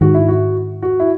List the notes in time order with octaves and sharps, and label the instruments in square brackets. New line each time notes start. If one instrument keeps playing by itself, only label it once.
[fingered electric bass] G#2 D#3 G#3 [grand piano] F#4
[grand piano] E4
F#4
F#4
E4